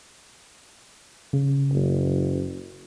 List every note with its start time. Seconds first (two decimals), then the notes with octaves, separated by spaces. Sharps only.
1.33 C#3
1.73 F#1